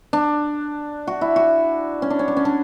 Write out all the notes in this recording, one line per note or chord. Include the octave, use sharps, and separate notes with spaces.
D4
F#4
E4
F#4
C#4
D4
C#4
D4
C#4
D4